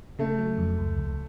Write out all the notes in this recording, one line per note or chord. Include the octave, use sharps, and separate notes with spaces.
C#3 A3
F#3
F2
C#2
C#2